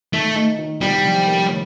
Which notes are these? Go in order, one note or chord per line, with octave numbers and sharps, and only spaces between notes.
D#3 A3
D#4
D#3
C2 G3
F3
A#3